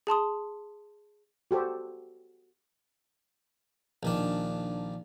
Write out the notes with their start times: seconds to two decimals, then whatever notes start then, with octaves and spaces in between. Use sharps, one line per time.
0.07 G#4 A5 C6 D#6
1.51 F#4 G4 A4 C5
4.03 A#1 D#3 D4